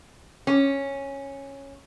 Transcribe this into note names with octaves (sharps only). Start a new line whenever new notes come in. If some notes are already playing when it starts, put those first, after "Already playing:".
C#4